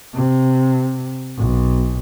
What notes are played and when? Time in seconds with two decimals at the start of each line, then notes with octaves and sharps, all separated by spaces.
0.14 C3
1.37 B1